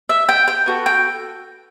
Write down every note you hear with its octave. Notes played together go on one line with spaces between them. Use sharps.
E5
G5
G5
B3 F#4 A4
G5